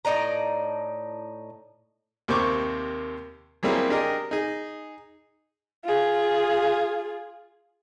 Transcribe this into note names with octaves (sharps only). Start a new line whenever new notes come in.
A2 D#4 D5 A#5
D#2 C3 A#3 C5 C#6 D6
F#3 G3 A#3 C4 E4 G#4
D4 G4 G#4 A#4 D#5
D#4 G#4
F4 G#4